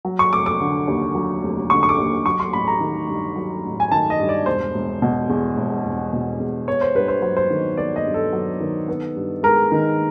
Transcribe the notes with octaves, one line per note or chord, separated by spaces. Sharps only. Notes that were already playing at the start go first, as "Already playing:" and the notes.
F#3
C#6
F1 D6
D6
D3
D#2
F#3
F1
D3 C#6
C#6
D6
D#2
F#3 C#6
C6
A1 B5
A#5
D#3
G2
F#3
A1
G#5
D#3 A5
D#5
G2
D5
E1 C5
E1
B2
E2
E1
E1
B2
E2
B3 C#5
C5
G2 B4
C5
F#3 C5
C5
D#3
B3 D5
D#5
G2
A4
F#3
D#3
B3
G2
G#3 A#4
D#3